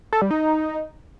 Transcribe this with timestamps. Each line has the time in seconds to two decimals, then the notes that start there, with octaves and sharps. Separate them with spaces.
0.13 A4
0.22 G3
0.31 D#4